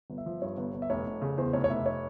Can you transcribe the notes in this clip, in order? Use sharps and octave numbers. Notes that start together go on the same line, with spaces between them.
G1
E5
F3
G2 C#5
G1
G1
E5
F1 C#5
F1
C#3
E2 C5
F1 C#5
C#5
F1 E5
C#5